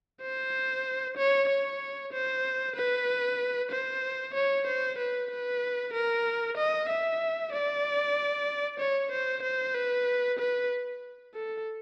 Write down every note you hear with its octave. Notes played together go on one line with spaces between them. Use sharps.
C5
C#5
C#5
C5
B4
C5
C#5
C5
B4
B4
A#4
D#5
E5
D5
C#5
C5
C5
B4
B4
A4